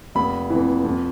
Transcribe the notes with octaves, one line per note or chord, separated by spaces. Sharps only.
F1 B5
F2 E3
F2